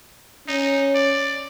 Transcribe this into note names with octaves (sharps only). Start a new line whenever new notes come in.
C#4 D#4
D5